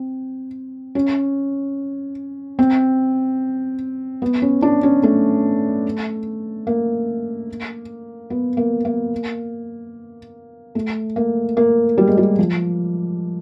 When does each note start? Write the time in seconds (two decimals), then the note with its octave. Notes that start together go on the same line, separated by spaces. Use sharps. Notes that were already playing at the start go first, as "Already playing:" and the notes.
Already playing: C4
0.95 C#4
2.59 C4
4.22 B3
4.42 C#4
4.62 D4
4.83 C#4
5.03 A3
6.67 A#3
8.30 B3
8.57 A#3
8.85 A#3
10.75 A3
11.16 A#3
11.57 A#3
11.98 G3
12.07 G#3
12.17 G3
12.39 F3